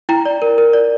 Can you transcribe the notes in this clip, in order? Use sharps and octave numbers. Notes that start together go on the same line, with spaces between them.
E4 G5 A#5
D5
A#4
A#4
D5